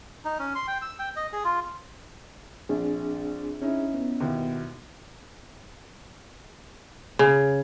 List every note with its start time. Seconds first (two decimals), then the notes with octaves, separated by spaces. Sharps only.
0.25 D#4
0.39 C#4
0.55 C6
0.67 G5
0.82 E6
0.99 G5
1.16 D#5
1.33 G#4
1.44 F4
2.69 A#1 C4 D4 G#4
3.61 C#4 D#4 E4
3.94 B3
4.20 D#2 B2 E4
7.19 C#3